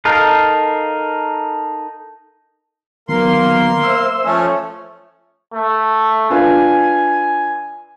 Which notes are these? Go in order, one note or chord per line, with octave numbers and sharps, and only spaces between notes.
D#4 A4 A#4 F5
D#3 F#3 A#3 B3 C6
C5 E5 E6
F3 A3 C#4
A3
D4 F4 B4 G#5